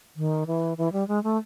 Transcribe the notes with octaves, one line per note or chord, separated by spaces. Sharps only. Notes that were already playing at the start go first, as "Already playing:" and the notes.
D#3
E3
E3
G3
G#3
A3